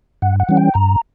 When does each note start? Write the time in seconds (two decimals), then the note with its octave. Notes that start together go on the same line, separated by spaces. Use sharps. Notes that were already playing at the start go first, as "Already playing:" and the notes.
0.22 G2 F#5
0.40 F#5
0.49 E3 G3 C#4
0.57 G5
0.74 G2 A#5